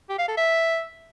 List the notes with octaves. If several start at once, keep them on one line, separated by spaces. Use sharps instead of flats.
G4
F5
A4
E5